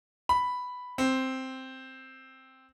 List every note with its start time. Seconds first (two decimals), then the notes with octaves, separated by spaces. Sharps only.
0.29 B5
0.98 C4